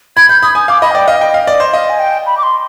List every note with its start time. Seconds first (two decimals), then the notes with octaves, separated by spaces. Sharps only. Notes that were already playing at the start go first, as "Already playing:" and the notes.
0.16 B5 G#6
0.29 B5 G6
0.42 B5 D#6
0.55 G#5 D#6
0.68 F5 D6
0.82 D#5 B5
0.91 F5
0.95 D5 G5
1.07 D#5 F5
1.21 D#5 G5
1.34 F5
1.47 D5 D#5
1.60 C5
1.73 D#5 F5
1.90 G#5
1.99 G5
2.26 B5
2.37 D6
2.43 C6